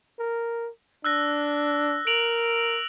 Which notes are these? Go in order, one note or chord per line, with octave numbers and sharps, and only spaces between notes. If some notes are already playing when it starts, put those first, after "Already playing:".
A#4
D4 E6 F#6 A#6
A#4 D7 F7 F#7